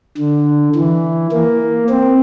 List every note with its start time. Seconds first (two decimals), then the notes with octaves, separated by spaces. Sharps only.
0.18 D3
0.76 E3
1.32 A#3
1.90 C4